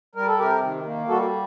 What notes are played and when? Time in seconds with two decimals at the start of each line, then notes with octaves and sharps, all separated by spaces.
0.15 G3 A#4
0.27 A4
0.38 C3 G4 A#4
0.62 D#3
0.85 A#3
1.08 G3 F#4 A4